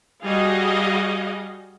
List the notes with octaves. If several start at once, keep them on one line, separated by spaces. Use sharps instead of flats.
G3 F#4 G#4 D#5 F5